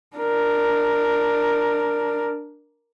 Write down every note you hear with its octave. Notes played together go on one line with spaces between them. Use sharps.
D4 A#4